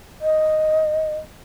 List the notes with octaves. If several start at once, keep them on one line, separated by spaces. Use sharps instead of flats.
D#5